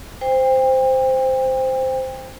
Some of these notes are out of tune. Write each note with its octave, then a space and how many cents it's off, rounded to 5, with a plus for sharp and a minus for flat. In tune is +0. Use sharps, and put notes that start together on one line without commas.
C5 -5 G5 +30